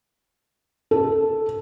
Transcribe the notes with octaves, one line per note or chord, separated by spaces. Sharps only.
A4